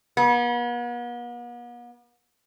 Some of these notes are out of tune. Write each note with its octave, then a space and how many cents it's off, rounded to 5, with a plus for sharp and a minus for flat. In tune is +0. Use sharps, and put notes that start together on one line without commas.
B3 -45